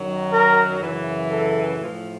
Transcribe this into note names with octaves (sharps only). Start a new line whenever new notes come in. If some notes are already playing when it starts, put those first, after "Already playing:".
Already playing: F#2 D#3 F#3
A#4
F#2 C#3 E3
A4
A2 F3